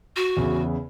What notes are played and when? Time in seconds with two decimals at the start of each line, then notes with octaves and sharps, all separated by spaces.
0.16 F#4
0.37 E2 C#3